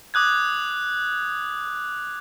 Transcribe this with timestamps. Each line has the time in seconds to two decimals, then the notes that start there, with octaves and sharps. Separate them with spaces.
0.14 D6 D#6 F#6 G#6